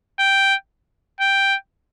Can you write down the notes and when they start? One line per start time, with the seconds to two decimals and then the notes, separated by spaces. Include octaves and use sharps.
0.19 G5
1.21 G5